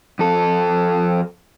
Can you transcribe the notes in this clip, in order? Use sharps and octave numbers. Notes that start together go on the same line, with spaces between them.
F2 A4